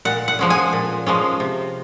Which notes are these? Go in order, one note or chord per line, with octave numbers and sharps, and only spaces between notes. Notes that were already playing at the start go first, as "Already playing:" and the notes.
A#2 F#5
F#5
F3 G#3 C#4
G#5
A#2
F3 G#3 C#4
C3